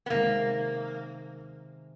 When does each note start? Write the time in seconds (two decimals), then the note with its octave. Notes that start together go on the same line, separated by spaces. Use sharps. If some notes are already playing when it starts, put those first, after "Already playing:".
0.06 B3
0.10 C3 D#3 G#3 A#3